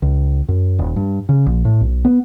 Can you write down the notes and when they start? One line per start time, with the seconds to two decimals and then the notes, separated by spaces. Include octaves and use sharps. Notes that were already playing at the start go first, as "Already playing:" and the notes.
0.02 C#2
0.49 F#2
0.79 D#1
0.96 G2
1.29 C#3
1.46 A#1
1.65 A2
1.81 B1
2.05 B3